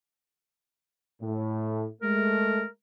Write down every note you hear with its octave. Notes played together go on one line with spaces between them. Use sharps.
A2
G#3 A3 A#4